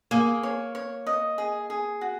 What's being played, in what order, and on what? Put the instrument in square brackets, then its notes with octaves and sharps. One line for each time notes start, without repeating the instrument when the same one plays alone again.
[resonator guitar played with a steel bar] A#3 [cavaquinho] G#4
[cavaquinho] C#5
C#5
D#5
G#4
G#4
F#4